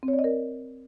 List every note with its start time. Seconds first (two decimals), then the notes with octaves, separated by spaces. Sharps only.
0.03 C4
0.08 C#5
0.13 D5
0.19 D#5
0.24 A#4